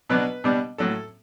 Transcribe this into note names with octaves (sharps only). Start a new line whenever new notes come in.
B2 F#3 B3 D4 B4
B2 G3 B3 D4
A2 F#3 C#4 A4